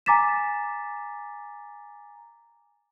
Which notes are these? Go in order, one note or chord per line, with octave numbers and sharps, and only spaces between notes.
G#5 A#5 D6 A6 B6 E7